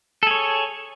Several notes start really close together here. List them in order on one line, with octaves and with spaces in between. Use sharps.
A4 G#4 C#5